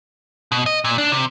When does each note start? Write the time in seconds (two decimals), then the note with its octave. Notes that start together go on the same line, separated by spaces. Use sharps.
0.52 B2
0.66 D#5
0.85 A#2
0.98 D4
1.12 C3